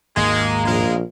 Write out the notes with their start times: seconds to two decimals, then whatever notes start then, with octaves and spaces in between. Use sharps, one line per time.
0.17 G#1 D#2 G#3 A#3
0.66 A#1 G#3 A#4